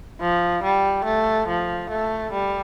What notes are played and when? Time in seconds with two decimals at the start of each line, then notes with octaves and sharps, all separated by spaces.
0.21 F3
0.63 G3
1.05 A3
1.48 F3
1.90 A3
2.32 G3